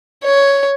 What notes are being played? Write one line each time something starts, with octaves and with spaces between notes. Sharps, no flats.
C#5